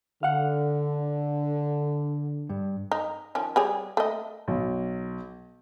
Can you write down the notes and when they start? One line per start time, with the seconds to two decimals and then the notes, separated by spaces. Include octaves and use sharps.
0.23 D3 F5 F#5
2.49 G2
2.92 D#4
3.35 D#3 F3 C#4
3.56 G3 G#4 C#5
3.97 A3 A#3 D#5
4.48 B1